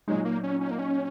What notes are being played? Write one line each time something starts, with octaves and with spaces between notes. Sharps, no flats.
A#2 F#3 G#3 D#4
A#3
C#4
C#4
A#3
C#4